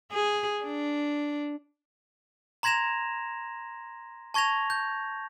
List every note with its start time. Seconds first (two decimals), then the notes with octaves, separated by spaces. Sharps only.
0.12 G#4
0.64 D4
2.63 A#5 C6 G#6 A#6 E7 F7
4.34 A5 C#6 G#6 A#6 F7
4.70 G6